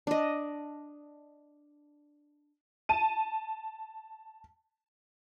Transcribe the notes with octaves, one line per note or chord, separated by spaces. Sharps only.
D4 D#5
A5 D#7